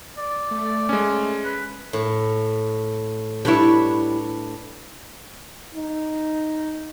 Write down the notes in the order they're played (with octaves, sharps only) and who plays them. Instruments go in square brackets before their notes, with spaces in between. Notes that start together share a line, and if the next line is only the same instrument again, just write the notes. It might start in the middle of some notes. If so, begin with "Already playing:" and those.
[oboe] D5
[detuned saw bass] A3
[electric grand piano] G#3 C#4
[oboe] B4
[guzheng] A2
[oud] G3 E4 [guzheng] D4 B4 C#5
[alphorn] D#4